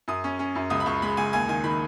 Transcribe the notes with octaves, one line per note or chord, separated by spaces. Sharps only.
F#2 D#6
C#4
C#4
F#2
C#2 D#6
B5
C#2 C#6
G#3 B5
C#2 G#5
D#2 G#5
D#3 G#5
D#3 B5